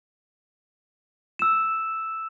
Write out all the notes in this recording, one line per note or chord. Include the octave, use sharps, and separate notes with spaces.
E6 E7